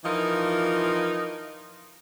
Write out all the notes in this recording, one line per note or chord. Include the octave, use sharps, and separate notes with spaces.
E3 F3 D#4 F4 A#4